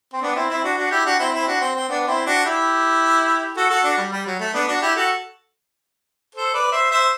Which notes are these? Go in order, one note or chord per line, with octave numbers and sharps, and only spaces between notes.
C4
B3 D4
C4 E4
C4 E4
D4 F#4
D4 F#4
E4 G4
D4 F#4
C4 E4
C4 E4
D4 F#4
C4
C4
B3 D4
C4 E4
D4 F#4
E4 G4
F#4 A4
F#4 A4
D4 F#4
G3
G3
F#3
A3
B3 D4
D4 F#4
E4 G4
F#4 A4
A4 C5
B4 D5
C5 E5
C5 E5